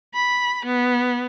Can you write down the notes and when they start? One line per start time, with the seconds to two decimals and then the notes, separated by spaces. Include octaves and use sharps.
0.15 B5
0.66 B3